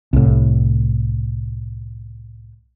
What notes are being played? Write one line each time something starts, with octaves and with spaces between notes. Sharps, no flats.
C2 A2